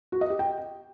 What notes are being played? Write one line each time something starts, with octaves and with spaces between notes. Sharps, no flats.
F#4
D#5
G4
G5